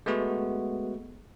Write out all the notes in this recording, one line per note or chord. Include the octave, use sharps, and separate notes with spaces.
G#3 A3 B3 F#4